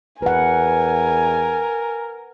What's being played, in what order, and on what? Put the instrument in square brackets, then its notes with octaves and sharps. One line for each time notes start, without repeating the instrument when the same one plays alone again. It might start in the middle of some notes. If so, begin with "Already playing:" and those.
[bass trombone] E2 [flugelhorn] A#4 [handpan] B4 F#5 [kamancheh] G#5